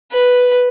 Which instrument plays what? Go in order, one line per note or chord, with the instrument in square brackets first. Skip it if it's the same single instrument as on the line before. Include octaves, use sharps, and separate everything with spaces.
[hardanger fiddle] B4